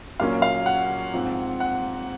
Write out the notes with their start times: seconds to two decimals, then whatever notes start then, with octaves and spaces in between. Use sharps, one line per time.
0.20 A#2 F#3 A#3 C#4 F4 F5
0.42 F5
0.66 F#5
1.14 G#2 F3 C4
1.60 F#5